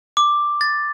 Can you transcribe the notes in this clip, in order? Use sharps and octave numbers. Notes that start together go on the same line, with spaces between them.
D6
A6